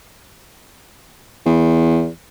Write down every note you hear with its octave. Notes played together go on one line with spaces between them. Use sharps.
E2